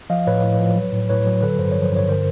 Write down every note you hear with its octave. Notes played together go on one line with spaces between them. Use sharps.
F3 D#5 F5
A2 B4 C#5
A2
F3
F#3
A2
A2 B4 C#5
F#3
D3 A4 B4
G2 C5
F3 C#5
C5
G2 C#5
D3 A#4 C5